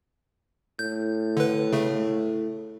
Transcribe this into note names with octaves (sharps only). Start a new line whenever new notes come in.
A2 G6
D3 B4
C#3 A3